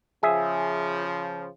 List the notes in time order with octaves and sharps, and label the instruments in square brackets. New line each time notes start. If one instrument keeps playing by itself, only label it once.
[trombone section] C#3 F3 [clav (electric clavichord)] G#4 E5